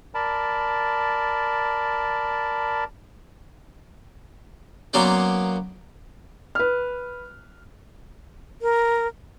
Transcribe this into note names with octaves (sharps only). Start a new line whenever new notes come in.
A#4 D5 A5 B5
F#3 A#3 B3 C#4 C5 D5
B4 F6
A#4